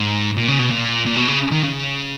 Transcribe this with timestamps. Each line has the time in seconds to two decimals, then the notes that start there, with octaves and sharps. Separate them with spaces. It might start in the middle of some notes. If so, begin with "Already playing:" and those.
Already playing: G#2
0.37 A#2
0.48 C#3
0.59 B2
0.71 A#2
1.06 A#2
1.17 B2
1.28 C#3
1.51 D#3
1.63 C#3